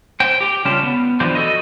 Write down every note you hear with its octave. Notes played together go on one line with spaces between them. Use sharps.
C5 G5
G4 G5
C#3 G3 C#4 F4 G4 A5
B3
E3 F3 B3 D4 G4 C5
F#4 A4 D#5